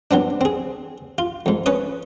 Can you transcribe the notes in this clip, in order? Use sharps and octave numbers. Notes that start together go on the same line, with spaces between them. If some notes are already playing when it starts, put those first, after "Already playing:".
F#3 B3 C4 D4
C4 G#4
F4
F2 G#2
C#4 B4 C#5 D#6